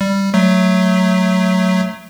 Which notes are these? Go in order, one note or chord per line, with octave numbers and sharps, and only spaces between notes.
G3
F#3 A3